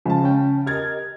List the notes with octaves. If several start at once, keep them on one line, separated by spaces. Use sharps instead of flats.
C#3 F3 G#3 A5
C#4 G5
G4 A#4 D#5 F6 G#6 A6